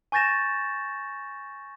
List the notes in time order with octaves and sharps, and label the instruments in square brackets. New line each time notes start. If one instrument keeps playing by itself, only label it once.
[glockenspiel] G#5 C#6 G6 A6 A#6 E7